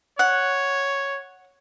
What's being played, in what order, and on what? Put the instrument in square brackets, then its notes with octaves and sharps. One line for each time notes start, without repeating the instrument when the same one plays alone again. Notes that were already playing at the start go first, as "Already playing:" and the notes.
[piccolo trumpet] C#5 [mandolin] F#5